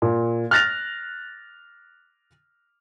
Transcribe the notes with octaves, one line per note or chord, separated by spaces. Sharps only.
A#2
F6 F#6 A6 A#6 F7